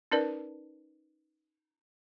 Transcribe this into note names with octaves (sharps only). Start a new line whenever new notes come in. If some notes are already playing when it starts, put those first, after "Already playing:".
C#4 D#4 A#4 B4 D5 A5